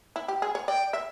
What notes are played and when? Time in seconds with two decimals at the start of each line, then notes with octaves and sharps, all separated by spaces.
0.16 E4
0.28 G4
0.42 G#4
0.55 C#5
0.67 D5 G5
0.93 E5